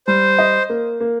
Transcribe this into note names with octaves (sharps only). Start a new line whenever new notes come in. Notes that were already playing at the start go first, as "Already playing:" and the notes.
G3 C5
D#5
A#3
A#3